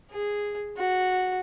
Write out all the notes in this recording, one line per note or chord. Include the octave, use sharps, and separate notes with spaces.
G#4
F#4